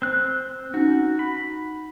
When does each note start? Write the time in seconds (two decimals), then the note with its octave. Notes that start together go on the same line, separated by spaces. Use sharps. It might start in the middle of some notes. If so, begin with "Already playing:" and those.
0.02 C4 F#6
0.74 C#4 D#4 F#4
1.19 B5